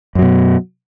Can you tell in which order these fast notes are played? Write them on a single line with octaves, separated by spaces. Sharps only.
F#2 F#3 B2